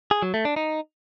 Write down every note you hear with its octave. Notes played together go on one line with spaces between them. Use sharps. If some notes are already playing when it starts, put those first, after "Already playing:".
G#4
F#3
A3
D4
D#4